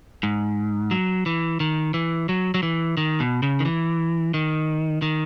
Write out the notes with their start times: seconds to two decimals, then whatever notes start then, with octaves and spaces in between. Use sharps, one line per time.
0.23 G#2
0.91 F#3
1.26 E3
1.60 D#3
1.94 E3
2.29 F#3
2.54 F#3
2.63 E3
2.97 D#3
3.20 B2
3.43 C#3
3.60 D#3
3.65 E3
4.34 D#3
5.02 D#3